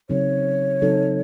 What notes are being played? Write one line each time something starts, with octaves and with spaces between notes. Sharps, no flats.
C#3 F#3 C4 D#4 A4 C#5
C#3 F#3 C4 D#4 A4